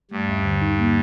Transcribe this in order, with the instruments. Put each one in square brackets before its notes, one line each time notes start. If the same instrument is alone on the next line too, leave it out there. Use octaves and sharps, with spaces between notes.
[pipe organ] G2 [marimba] A3
[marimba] D#2
D3
D#4
A#3